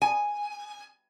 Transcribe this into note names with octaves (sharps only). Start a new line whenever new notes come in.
G#5